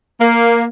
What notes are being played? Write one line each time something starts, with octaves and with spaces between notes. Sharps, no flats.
A#3